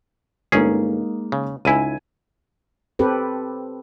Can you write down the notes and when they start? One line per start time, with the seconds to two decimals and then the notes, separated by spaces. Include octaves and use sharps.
0.52 G1 G#3 A#3 C#4 D#4 G#4
1.32 C#3
1.65 C#2 D#4 E4 G#5 D#7
2.99 C4 G4 A4 B4